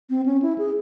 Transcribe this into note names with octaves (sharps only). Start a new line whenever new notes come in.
C4
C#4
E4
G#4